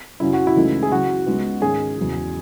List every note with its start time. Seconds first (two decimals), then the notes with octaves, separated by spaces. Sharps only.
0.20 F#2 C#3 F#3 C#4 E4
0.33 F#4
0.47 E4
0.56 C#2 C#3 E3 A3 D#4
0.83 G#4
0.92 C#3 F#3 C#4 F#4
1.26 C#2 C#3 G#3 B3 D#4
1.62 G#2 D#3 G#3 C#4 G#4
1.97 E2 C#3 F#3